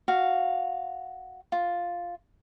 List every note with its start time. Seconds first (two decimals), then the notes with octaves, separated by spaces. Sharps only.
0.08 F#4 F5
1.52 F4